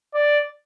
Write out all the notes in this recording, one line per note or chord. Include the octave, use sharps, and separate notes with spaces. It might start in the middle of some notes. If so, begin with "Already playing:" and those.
D5